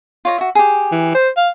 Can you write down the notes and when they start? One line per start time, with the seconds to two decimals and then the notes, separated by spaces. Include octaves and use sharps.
0.25 F4 C#5 D#5
0.38 F#4 E5
0.55 G4 G#4
0.92 E3
1.15 C5
1.37 F5